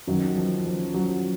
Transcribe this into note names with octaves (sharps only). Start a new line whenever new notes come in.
F#2 D#3 F#3
F3
F3
F#3